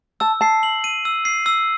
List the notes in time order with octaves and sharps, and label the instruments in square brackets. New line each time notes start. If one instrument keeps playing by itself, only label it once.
[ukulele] A5 [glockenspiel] E6
[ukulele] A5 [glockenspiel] C7
[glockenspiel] F#7
D#7
E6
C7
E6